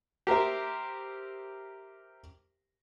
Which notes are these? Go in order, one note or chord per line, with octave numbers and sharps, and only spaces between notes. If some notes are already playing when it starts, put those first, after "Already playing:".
G4 A#4 C5 E5